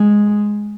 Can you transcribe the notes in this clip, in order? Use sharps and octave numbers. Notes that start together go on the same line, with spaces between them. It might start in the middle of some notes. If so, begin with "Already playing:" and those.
Already playing: G#3